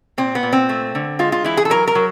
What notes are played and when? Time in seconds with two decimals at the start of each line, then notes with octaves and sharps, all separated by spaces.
0.18 A#2 C4
0.35 B3
0.43 A#2
0.53 C4
0.69 A3
0.95 D3
1.19 G#3 F4
1.32 F4
1.44 E3 E4
1.57 G#4
1.65 A4
1.70 F#3 A#4
1.88 A#4
1.95 F#3